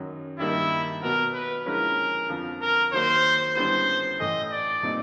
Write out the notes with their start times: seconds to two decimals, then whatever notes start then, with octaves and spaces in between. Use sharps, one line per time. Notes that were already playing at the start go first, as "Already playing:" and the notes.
Already playing: F#2 D#3 F#3
0.39 G2 D#3 G3 A#3 D#4 E4
1.03 B2 F#3 B3 A#4
1.34 B4
1.65 D3 F3 G#3 C#4 E4 A#4
2.29 F2 D3 F3
2.62 A#4
2.93 D#3 F#3 A#3 C5
3.56 F#2 D3 G3 B3 E4 C5
4.20 A2 E3 A3 D#5
4.51 D5
4.83 A#2 G3 C4 D#4